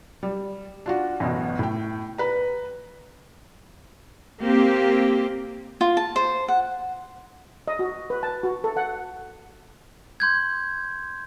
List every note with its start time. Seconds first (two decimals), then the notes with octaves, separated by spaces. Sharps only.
0.23 G3
0.86 D4 F4 F#4
1.20 A1 F#2 B2
1.59 A2 G5
2.18 B4 A#5
4.40 A#3 C4 G4
5.81 F4
5.97 A5
6.16 C5
6.48 F#5
7.68 D#5
7.79 F#4
8.10 B4
8.23 A5
8.43 F#4
8.64 A4
8.77 F#5
10.20 C6 G6 G#6